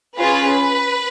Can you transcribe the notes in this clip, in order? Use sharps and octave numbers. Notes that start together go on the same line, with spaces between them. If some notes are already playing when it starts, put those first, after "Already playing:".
C#4 F4 G#4 B4